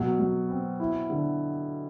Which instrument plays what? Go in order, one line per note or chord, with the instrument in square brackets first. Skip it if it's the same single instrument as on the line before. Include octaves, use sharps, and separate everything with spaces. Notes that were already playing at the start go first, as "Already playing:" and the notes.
Already playing: [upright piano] B2 [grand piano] F#3
[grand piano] F#3
C4
E4
D3